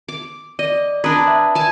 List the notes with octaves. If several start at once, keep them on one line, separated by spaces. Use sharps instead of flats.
D6
D5 D#5
D4 B4 A#5 D#6 G#6
E5
G#5 A5